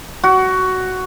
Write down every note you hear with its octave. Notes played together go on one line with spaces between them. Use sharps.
F#4